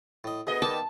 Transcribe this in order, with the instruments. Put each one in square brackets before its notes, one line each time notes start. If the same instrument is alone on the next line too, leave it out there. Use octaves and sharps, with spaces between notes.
[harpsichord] A2 D#5
[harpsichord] D2 [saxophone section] B3 [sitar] G#4 D#5
[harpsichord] D#3 G3 A#3 [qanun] A5